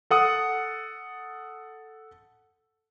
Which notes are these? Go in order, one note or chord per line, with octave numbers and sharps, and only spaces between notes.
A4 F#5 D#6